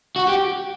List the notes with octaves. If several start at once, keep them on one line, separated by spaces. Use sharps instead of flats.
F#4
G4